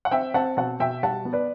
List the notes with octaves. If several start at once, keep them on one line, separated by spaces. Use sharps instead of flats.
F#5
C4 E5 G5
C4 F#5 A5
B2 F#5 A5
B2 E5 G5
G3 F#5 A5
B3
B4 D5